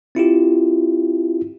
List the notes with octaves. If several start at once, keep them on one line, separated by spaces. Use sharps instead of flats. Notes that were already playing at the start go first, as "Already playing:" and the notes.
C4 E4 F4 G4